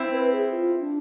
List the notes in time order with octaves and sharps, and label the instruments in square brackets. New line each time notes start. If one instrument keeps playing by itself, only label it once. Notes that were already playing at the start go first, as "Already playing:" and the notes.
Already playing: [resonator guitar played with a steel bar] C4 E4
[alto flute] B4
G#4
F4
D4